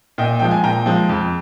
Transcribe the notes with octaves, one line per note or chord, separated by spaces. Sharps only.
A#2 D#5 G5
F3 G#3 G5
G#5
A#2 G5 A#5
F3 G#3
F2